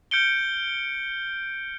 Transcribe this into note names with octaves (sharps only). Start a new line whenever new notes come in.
F6 G6 C#7 D7 G7